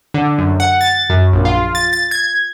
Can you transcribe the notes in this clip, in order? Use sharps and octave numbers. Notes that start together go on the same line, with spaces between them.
D3
F#2
F#5
A6
F#2
A#1
F4
A6
A6
G#6